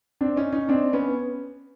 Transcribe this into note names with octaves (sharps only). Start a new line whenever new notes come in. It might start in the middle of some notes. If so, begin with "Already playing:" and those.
C4 D4
C#4 D#4
C#4 D#4
C4 D4
B3 C#4